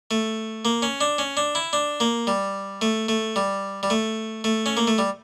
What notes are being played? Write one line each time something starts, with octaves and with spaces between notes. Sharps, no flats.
A3
A#3
C#4
D4
C#4
D4
E4
D4
A#3
G3
A3
A3
G3
G3
A3
A3
C#4
A#3
A3
G3